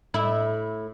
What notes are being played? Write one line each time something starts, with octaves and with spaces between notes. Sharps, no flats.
A2 E4